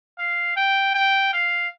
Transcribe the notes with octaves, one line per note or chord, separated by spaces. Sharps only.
F5
G5
G5
F5